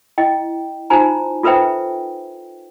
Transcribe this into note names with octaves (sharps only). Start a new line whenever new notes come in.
E4 D#5 G5
D#4 F4 C5 G#5 A#5
F4 A4 B4 C5 E5 G5